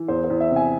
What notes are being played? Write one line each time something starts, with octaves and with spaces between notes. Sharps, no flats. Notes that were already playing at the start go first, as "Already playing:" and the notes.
Already playing: E3
E2 C5
C5
E2
E5
C3
G#5